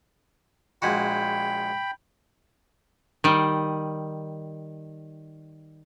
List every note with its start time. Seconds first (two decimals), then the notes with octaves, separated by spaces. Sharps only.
0.82 A#1 G#3 F#4 G5 B5
3.24 D#3 G3